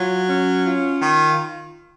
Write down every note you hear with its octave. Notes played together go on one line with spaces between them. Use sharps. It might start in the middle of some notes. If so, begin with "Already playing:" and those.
Already playing: F#3 F4
C#4
F4
D#3